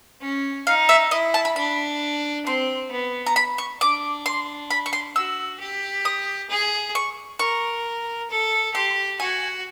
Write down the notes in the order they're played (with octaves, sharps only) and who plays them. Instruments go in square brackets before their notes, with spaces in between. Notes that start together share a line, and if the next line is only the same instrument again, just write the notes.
[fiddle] C#4
[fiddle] D#4 [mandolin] F5
[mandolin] E5
[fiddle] E4 [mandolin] D#5
[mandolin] A5
B5
[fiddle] D4 [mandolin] B5
[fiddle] C4 [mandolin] C6
[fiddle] B3
[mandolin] A#5
B5
C#6
[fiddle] D4 [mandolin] D6
[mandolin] C6
B5
C#6
C6
[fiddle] F#4 [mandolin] E6
[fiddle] G4
[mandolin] D#6
[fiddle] G#4
[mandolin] C#6
[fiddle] A#4 [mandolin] C#6
[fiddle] A4
[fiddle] G4 [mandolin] C6
[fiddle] F#4 [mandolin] G#5